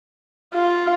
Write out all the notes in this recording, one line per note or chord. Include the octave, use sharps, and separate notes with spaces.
F4